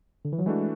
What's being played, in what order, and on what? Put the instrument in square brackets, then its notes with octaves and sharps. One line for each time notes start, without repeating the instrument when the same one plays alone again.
[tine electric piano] D3
E3
F#3
[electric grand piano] E3 A3 D4 F#4 [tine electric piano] G#3